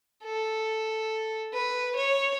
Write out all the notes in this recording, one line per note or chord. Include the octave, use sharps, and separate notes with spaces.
A4
B4
C#5